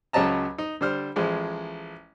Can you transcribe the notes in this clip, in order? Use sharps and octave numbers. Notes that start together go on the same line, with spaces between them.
C#2 C#3 F#3 D#5 A5 A#5
D#4
D3 G3 C5 F6
A1 F3 G#3